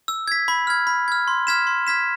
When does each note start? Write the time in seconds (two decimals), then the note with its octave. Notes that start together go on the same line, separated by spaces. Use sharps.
0.08 E6
0.28 G#6 B6
0.48 B5
0.67 F6 G#6
0.87 B5
1.08 F6 G#6
1.28 C6
1.47 F6 G#6 B6 E7
1.67 C6
1.87 F6 G#6 B6 E7